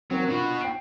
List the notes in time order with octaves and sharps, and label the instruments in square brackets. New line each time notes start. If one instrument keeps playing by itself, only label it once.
[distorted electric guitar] F#3 [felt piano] C4 A#4
[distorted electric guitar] B2 F#4 [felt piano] D4 F4
[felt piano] G5 C7 D7